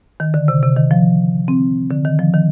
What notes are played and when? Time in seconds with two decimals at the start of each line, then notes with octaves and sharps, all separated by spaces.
0.20 D#3
0.34 D3
0.48 C3
0.63 C3
0.76 D#3
0.91 F3
1.48 C4
1.90 D3
2.05 D#3
2.19 F3
2.34 D#3